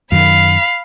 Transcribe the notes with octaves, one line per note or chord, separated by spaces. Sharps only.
F#2 D#3 F5 B5